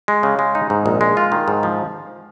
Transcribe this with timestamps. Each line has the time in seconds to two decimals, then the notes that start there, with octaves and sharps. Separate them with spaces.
0.08 G#3
0.23 C#3
0.39 G#3
0.55 D#4
0.70 G#2
0.86 A#1
1.01 G#3
1.17 F4
1.32 D#3
1.48 G#2
1.63 F3